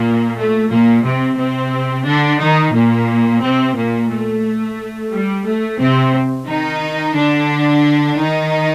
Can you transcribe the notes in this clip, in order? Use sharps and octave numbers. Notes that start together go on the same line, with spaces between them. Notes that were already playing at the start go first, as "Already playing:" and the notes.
Already playing: A#2 A#3
A3
A#2 A#3
C3 C4
C3 C4
D3 D4
D#3 D#4
A#2 A#3
C3 C4
A#2 A#3
A3
G3
A3
C3 C4
D#3 D#4
D3 D4
D#3 D#4